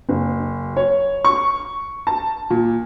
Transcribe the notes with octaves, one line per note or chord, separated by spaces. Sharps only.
F#1
C#5
C#6
A5
A#2